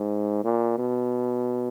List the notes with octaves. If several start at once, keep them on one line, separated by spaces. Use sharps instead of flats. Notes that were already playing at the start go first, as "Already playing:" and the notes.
Already playing: G#2
A#2
B2